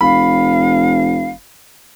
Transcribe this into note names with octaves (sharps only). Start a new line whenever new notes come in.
F1 F5 B5